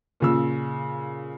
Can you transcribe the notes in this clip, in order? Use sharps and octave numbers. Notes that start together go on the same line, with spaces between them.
A#2 C#3 E6